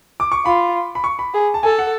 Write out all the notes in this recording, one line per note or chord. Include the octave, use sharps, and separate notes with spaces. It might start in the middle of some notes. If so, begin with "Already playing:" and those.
D6
C#6
F4 B5
B5
C#6
B5
G#4
A5
A4 G#5
F#5